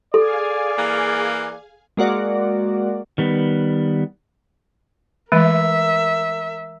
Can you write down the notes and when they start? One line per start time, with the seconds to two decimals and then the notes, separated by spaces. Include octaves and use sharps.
0.14 G#4 A4 D5 F5 G#5
0.78 E3 A#3
1.97 G#3 A#3 F#4 D5
3.18 D#3 G3 B3
5.32 E3 G#3 A3 A#4 E5